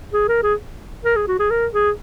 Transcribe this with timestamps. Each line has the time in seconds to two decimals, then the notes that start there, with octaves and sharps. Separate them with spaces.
0.13 G#4
0.28 A#4
0.43 G#4
1.05 A#4
1.16 G#4
1.28 F#4
1.40 G#4
1.51 A#4
1.74 G#4